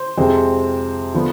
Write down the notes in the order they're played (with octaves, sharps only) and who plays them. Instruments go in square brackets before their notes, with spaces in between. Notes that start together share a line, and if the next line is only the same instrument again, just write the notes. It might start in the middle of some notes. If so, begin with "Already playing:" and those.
Already playing: [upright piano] C5
F2 C3 G#3 C4
D3 F3 B3